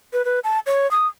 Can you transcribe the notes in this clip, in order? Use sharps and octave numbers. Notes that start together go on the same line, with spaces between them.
B4
B4
A5
C#5
D#6